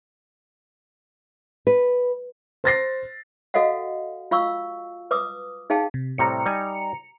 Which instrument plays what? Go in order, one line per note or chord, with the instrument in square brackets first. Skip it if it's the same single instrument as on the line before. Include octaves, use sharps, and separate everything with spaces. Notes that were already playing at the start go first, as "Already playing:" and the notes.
[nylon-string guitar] B4
[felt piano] C5 A6 A#6 C7
[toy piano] F#4 A4 D#5 F5 F#5
F4 F5 C#6 E6
B4 D6 D#6
D#4 G#4 F5 G5 A5
[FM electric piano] C3
[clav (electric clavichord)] A2 C3 G3 [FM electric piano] A#5 C#7
[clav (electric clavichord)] G3 D#4 G#5